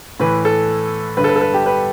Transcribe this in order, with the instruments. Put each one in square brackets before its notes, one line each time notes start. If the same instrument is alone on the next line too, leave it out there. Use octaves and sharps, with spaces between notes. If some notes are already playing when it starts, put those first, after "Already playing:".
[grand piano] A2 E3 B4
A4
G2 D3 B4
A4
B4
A4
B4
G4
B4